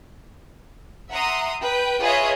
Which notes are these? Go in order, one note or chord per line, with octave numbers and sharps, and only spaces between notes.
E5 F#5 A#5 C6 D#6
B4 G5
F4 G#4 B4 C#5 D#5 E5